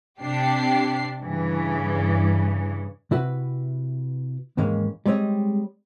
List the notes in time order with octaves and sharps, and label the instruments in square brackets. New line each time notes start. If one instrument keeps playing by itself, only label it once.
[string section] C3 D4 G4 C7
G2 C#3 E3
[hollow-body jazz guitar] C3 E4 F#4 B4
D#2 G#2 E3 G#3 A#3 C#4
G3 G#3 C4 C#5 D#5